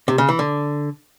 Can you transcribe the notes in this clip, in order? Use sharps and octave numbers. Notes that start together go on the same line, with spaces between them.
C3
C#3
E3
D3